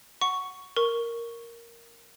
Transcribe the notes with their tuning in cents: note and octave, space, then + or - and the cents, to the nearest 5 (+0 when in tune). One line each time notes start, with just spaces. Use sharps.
F#5 +0 C#6 +5
A#4 +0 C#6 +0